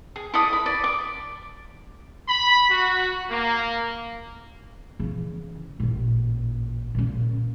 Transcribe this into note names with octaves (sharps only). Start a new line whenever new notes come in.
G#4
E4 A4 D5 D#6
B5
D5
D6
B5
F#4
A#3
C#3 E3
A1 A#2
A#2 C#3